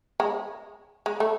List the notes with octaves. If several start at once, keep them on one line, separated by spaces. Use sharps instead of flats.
G#3
G#3
A3